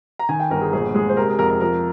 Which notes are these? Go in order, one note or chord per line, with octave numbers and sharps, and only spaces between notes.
A#5
D#3 G#5
G5
G1 A#4
G#4
A#1 G#4
G#3 G#4
C5
C3 A#4
G#4
F2 A#4
A#4
F3 A#4